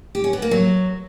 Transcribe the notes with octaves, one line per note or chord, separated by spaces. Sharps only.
G4
C#4
B3
A#3
F#3